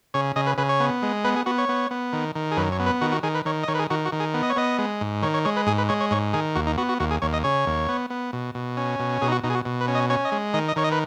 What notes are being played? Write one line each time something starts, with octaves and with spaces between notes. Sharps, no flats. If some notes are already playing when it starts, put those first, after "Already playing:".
C#3 C#5
C#3 D#5
B4
C#3 B4
C#5
B3
G#3
B3 B4
G#4
B3 F#4
C#5
B3
B3
D#3
D#3
G#4
F#2 B4
C#5
B3
B4
D#3 F#4
F#4
D#3 G#4
B4
D#3 C#5
D#5
D#3 C#5
B4
G#4
D#3 F#4
F#4
D#3
G#4
B3
D#5
C#5
B3 D#5
G#3
G#2
D#3 C#5
C#5
G#3 C#5
B4
G#2 G#4
B4
G#3 C#5
C#5
G#2 C#5
D#3 G#4
D#2 F#4
D#4
B3 F#4
F#4
D#2 F#4
G#4
D#2 C#5
D#5
C#3 C#5
D#2
B3
B3
B2
B2
C#4
B2
B2 G#4
D#4
F#4
B2 D#4
G#4
F#4
B2
B4
C#4
D#5
C#4 C#5
D#5
G#3
D#3 D#5
D#5
D#3 C#5
D#5
B4